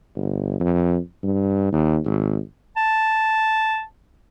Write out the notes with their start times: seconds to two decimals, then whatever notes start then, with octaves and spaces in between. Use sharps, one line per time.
0.16 G1
0.60 F2
1.23 G2
1.72 D#2
2.05 G#1
2.77 A5